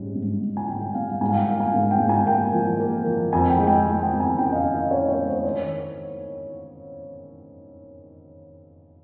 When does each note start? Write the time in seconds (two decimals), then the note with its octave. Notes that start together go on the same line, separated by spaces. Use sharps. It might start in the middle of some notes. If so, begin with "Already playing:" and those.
Already playing: G#2 G3 C#4
0.15 G#2
0.41 G3
0.57 G#5
0.68 G#2 G5
0.81 G5
0.95 G3 F5
1.08 F5
1.21 G#2 G#5
1.30 F5
1.34 G5
1.48 A#3 F5
1.60 G#5
1.73 G#2 F5
1.91 G5
2.00 G#2
2.09 G#5
2.26 A#3 G5
2.54 F3
2.80 A#3
3.06 F3
3.33 F2 G#5
3.50 G5
3.59 G#3
3.67 G5
3.86 G#3
4.03 G5
4.12 F2
4.20 G#5
4.38 C#4 G5
4.52 D#5
4.55 F5
4.64 C#4
4.73 D#5
4.90 C#4 C#5
5.08 C#5
5.17 G#3
5.26 C5
5.43 D#3 C#5